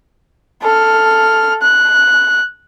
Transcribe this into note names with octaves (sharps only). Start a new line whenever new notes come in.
A4 F6
F#6